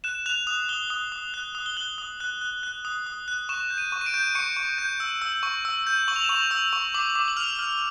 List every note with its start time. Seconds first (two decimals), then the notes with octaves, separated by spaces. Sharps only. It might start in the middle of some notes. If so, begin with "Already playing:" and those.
0.04 F#6 E7
0.26 F#6 F7
0.47 D#6 F7
0.69 D#6 G7
0.90 D#6
1.12 D#6
1.34 F#6
1.55 D#6
1.66 G7
1.77 F#6 F#7
1.98 D#6
2.20 F#6
2.41 F#6
2.63 F#6
2.85 D#6
3.06 D#6
3.28 F#6
3.49 C#6 E7
3.70 G6
3.78 D#7
3.92 C#6
4.01 D#7
4.06 D7
4.14 G6
4.35 C#6 C#7
4.57 C#6
4.78 G6
5.00 E6
5.22 E6
5.43 C#6
5.65 E6
5.87 G6
6.08 C#6 F#7
6.16 F7
6.24 E7
6.29 C#6 F7
6.51 E6
6.73 C#6
6.94 D6 F#7
7.15 D6
7.28 F#7
7.37 F6 F7
7.59 F6